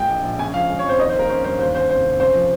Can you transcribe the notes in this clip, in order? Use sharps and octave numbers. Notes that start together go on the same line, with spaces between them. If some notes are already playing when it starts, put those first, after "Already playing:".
Already playing: A#2 G#3 G5
A#1
A#1
C#3 G#5
F3 F5
G#3
C#5
F2 C5
D#3 D#5
C5
A#3 A#4
C#4 C5
G2 C5
D#2 C5
C#3 C5
F1 C5
F1
C#3 C5
F3